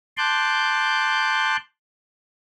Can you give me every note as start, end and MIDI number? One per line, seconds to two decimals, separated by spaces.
0.18 1.57 81
0.18 1.57 84
0.18 1.57 86
0.18 1.57 90
0.18 1.57 91